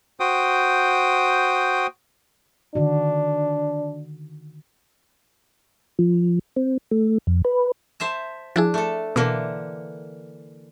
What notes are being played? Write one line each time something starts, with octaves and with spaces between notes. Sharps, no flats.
F#4 C5 G5 D#6
D3 D#3 D4 F#4
F3
C4
A3
F2
B4
C5 E5 A5
F3 D4 E4 G#4
A3 A4
B2 D3 E3 A#3